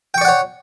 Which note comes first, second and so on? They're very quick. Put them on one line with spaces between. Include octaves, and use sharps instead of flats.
G5 C#6 D5 F#5 C#5